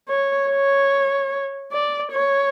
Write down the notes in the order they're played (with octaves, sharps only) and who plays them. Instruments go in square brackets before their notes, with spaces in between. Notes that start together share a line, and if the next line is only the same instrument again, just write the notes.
[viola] C#5
C#5
D5
C#5